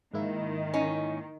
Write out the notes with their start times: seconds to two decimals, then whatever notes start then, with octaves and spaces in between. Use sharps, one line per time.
0.14 G#2 D#3 A#3 E4
0.74 C#4 D#4